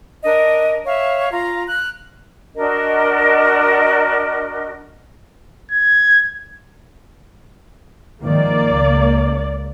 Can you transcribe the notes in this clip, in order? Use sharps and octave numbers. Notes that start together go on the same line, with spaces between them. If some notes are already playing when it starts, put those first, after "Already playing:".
D4 A#4 D#5
C#5 E5 F5
F4 A#5
F6 F#6
D4 F#4 A#4 D#5
G#6
G#2 D#3 F3 A#3 D5
C#2